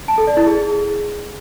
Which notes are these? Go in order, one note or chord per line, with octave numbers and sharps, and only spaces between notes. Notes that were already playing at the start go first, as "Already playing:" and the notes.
A5
A4
D5
E4
G#4